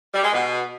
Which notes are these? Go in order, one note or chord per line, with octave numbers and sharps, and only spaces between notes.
G3
G#3
B2